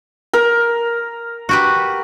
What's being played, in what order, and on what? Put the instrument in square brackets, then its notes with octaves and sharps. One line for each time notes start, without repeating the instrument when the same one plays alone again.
[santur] A#4
[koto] F#4 G4 B4